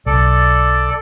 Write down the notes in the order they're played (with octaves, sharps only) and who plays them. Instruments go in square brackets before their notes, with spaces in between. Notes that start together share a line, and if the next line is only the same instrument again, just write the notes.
[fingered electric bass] B1 [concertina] A4 D5